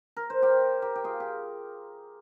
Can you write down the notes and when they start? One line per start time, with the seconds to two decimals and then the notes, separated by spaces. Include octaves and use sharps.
0.17 A#4
0.30 C5
0.42 G4 A#4
0.82 G4 A#4
0.95 G4
1.04 F4 G#4
1.20 G4